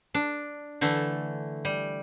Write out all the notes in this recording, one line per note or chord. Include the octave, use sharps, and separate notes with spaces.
D4
D3 E3 A3
G3